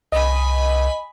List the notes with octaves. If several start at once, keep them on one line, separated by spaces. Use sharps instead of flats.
C2 D#5 G#5 B5